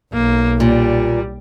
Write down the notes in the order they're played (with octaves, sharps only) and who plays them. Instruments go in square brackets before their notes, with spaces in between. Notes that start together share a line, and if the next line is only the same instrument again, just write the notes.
[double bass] B1 [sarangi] A#3
[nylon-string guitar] A#2 [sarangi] G3